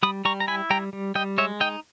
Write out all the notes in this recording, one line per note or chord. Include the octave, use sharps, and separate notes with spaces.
G3 B5 D#6
G3 A#5 C#6
A#5
E4 G#5 B5
G3 G5 A#5
G3
G3 D#5 G5
G#3 C#5 E5
D#4 D#5 G5